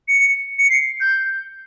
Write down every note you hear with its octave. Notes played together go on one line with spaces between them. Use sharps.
C#7
C#7
C7
G6